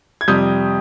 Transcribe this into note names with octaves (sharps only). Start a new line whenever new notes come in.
G#6
F2 C3 G3 D#6 G6